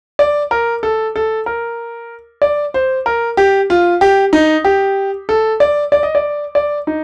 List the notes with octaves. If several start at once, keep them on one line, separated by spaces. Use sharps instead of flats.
D5
A#4
A4
A4
A#4
D5
C5
A#4
G4
F4
G4
D#4
G4
A4
D5
D5
D#5
D5
D5
D#4